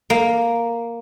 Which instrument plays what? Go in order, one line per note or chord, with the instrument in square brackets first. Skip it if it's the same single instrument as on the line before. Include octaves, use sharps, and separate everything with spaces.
[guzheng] A#3